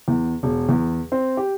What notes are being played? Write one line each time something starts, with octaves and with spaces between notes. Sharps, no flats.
E2
E1
E2
C4
G4